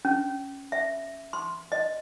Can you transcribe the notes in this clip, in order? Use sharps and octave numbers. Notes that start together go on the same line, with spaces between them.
C#4
E5
C6
D#5